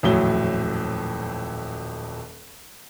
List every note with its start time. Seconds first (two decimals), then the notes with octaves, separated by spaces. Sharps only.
0.03 D#1 F2 A2 F#3 G7